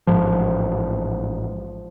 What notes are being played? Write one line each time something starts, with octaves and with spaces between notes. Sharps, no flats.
A1 G#2 F3